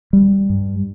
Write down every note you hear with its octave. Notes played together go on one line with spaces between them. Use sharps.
G3
G2